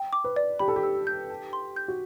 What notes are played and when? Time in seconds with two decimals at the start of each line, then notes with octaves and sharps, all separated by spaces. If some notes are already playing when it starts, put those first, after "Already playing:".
Already playing: G5
0.13 D6
0.24 B4
0.36 D5
0.59 G4 B5
0.68 A4
0.76 G4
0.83 E6
1.07 G6
1.30 A5
1.53 C6
1.76 G6
1.88 F#4